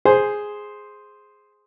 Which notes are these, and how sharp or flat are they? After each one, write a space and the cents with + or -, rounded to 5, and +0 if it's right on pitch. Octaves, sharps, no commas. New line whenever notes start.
G#4 +0 C5 +0